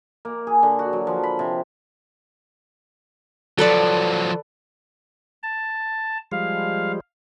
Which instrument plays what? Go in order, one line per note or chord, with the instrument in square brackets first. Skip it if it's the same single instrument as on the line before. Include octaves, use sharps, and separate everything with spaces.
[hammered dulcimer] A#3
G#4
D3
F#4
F#3
F3
B5
C3
[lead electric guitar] F3 F#3 [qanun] A4 B4 D5
[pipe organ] A5
[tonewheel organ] F3 G3 G#3 [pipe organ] F5